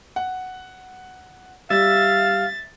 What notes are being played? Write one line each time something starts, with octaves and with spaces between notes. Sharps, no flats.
F#5
G3 E5 F5 A6